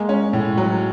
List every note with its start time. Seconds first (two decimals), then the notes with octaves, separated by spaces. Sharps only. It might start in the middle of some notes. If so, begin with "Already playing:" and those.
Already playing: G#3 A#3
0.09 C#4
0.33 A2
0.58 F#3